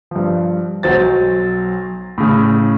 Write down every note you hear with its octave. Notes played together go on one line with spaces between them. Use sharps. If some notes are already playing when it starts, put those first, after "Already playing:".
G2 F3
B1 F#3 C5 A6
A2 C#3